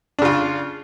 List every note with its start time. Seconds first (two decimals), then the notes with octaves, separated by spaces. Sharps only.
0.19 D4
0.22 C#3
0.25 F4